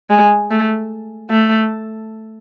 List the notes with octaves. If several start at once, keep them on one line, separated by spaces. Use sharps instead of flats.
G#3
A3
A3